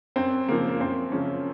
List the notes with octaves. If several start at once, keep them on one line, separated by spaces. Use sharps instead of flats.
F#2 C4
C#3 F3 A#3
A#3
F#2 C4
C#3 F3 C#4